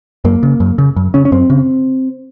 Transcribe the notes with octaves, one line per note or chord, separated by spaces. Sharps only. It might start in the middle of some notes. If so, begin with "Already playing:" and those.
F#2 A#3
C#3
F#2
C#3
F#2
C#3 C#4
C#4
F#2 C4
C#3